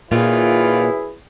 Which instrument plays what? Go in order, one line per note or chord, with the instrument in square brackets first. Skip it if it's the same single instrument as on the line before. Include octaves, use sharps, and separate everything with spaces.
[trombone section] F#2 E4 B4 [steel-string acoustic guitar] A#2 [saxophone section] D#3 E3 F4 [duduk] G#4